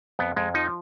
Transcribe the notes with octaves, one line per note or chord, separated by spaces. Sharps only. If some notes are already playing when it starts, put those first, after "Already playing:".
F2 B3
F2 G#3
F3 D#4